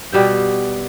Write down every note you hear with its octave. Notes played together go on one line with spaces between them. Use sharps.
B2 G3 E5 G5